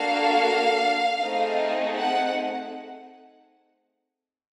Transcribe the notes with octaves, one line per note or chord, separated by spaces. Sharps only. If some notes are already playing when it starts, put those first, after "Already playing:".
Already playing: A#3 D4 F#4 A4 F5
A3 C4 D#4 G#4
F#5